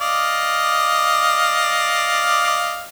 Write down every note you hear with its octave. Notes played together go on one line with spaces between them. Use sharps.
D5 D#5 F5